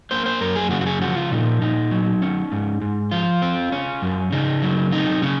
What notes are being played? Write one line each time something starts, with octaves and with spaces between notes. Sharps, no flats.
A#3 C5
C5
F#2 A#4
G#4
C#3 F#4
F#4
G#4
F3 F#4
F4
A#2 D#4
A#2 D#4
F#3
C#4
G#2
G#2
F3 F4
C4
C#4
F#2
C#3 D#4
F#3
C4 D#4
C#3 C#4